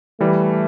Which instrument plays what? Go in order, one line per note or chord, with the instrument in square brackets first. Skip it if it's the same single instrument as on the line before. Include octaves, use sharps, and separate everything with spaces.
[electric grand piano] E3 G3 [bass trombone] A3